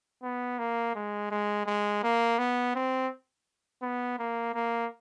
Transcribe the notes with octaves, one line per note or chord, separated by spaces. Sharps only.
B3
A#3
G#3
G#3
G#3
A#3
B3
C4
B3
A#3
A#3